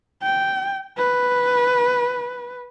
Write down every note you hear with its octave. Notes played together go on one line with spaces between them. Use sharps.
G5
B4